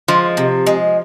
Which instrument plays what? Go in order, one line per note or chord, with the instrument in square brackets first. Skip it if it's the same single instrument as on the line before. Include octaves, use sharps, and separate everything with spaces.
[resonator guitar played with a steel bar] F3 [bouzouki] G#3
[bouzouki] C3
G#3